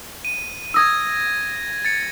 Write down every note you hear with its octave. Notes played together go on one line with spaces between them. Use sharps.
D#7
D#6 E6 G#6 A#6 D#7
A6 C#7